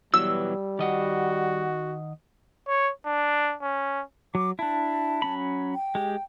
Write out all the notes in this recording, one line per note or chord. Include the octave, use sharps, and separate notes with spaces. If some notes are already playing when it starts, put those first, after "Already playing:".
B2 E3 F#3 G3 E6
D#3 F#4 D#5 F#5
C#5
D4
C#4
F#3 D6
D4 E4 A5
F#3 C#4 B5
G5
G#3 G4